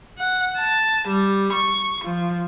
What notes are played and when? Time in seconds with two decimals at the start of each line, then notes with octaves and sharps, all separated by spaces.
0.19 F#5
0.58 A5
1.08 G3
1.53 C#6
2.05 F3